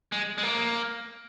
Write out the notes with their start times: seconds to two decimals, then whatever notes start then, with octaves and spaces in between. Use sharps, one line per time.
0.12 G#3
0.38 G#3
0.43 A#3